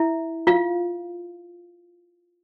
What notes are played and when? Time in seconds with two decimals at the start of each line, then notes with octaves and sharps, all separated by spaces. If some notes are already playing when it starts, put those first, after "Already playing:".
Already playing: E4 E5
0.47 F4 F5